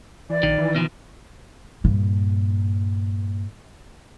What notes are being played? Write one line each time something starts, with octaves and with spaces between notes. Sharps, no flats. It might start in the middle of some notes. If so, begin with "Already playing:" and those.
E3 D5
A#1 D#3
E3
B2 D#3 F3
G2 A#2